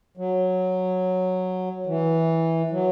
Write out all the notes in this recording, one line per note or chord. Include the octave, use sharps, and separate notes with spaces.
F#3
E3
F#3